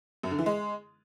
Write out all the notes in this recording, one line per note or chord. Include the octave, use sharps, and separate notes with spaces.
F#2
D3
E3
G#3